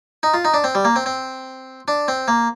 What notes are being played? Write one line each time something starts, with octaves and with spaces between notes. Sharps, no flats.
D#4
F4
D#4
D4
C4
G3
A#3
C4
C4
D4
C4
A#3